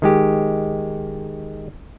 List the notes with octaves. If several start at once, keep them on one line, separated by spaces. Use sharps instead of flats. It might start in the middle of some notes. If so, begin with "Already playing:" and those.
D#3 G#3 G4